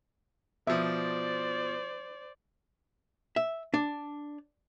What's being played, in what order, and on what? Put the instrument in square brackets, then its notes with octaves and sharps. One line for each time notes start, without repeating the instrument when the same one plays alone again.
[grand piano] B2 F3 [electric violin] C5 D5 [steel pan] E5
[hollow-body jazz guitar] E5
D4